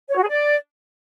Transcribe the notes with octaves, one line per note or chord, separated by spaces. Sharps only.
C#5
F#4
G#4
D5